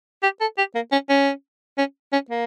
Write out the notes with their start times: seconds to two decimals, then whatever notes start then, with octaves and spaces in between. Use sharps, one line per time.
0.23 G4
0.41 A4
0.58 G4
0.75 A#3
0.92 C#4
1.09 C#4
1.78 C#4
2.13 C#4
2.30 A#3